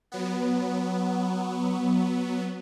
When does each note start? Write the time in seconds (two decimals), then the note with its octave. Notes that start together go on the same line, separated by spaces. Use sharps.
0.12 F#3 B3